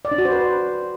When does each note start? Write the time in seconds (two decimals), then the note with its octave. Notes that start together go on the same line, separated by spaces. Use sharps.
0.05 D5
0.11 D4
0.18 F#4
0.25 C5
0.32 B4